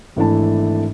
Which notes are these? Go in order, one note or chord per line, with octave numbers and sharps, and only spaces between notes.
G#1 E3 A3 D4 E4 A5